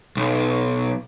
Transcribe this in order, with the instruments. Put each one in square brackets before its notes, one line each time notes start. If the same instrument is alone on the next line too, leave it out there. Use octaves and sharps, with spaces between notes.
[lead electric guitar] B1